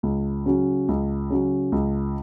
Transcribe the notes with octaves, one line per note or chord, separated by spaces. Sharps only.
C#2
C#3 F#3
C#2
C#3 F#3
C#2